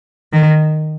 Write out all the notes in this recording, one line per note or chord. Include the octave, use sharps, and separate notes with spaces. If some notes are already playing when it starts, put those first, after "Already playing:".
D#3